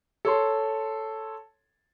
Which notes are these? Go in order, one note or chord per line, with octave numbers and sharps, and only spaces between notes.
A4 C#5 C6